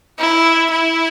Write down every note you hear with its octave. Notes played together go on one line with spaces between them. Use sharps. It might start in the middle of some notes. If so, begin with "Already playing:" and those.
E4
E4